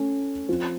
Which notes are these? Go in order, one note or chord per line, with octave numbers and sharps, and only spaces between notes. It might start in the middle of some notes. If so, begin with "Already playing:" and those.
Already playing: A3 C#4 A4
F3 C4 F4